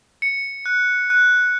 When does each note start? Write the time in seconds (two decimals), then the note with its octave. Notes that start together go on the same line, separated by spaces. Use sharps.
0.22 C#7
0.66 F#6
1.10 F#6